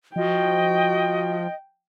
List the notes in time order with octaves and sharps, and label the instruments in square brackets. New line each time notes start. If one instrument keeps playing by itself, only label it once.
[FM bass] F3 [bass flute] F#4 [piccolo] D#5 [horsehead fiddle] G5